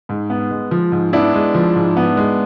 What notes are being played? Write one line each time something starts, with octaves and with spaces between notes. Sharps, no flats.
G#2
B3
G#3
F3
G#2
B3 D4 E4
G#3
F3
G#2
B3
G#3